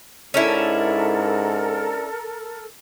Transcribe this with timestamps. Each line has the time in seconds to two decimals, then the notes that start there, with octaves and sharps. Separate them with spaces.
0.34 G#2 C#4 D4 E4 A4 A#4